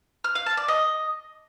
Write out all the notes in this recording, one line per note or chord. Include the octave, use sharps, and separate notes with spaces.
F6
F5
A5
D5
D#5